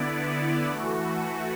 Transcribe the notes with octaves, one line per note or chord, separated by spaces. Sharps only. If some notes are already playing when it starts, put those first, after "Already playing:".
Already playing: D3 B3 E4 D5
E3 A3 F#4